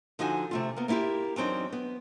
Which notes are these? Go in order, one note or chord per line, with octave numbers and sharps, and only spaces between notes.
D3 F3 D#4 F#4 G#5
C3 A3 F4
A#3 B3
A#3 B3 E4 F4 G4
E2 F#3 C4 D4 D#4
B3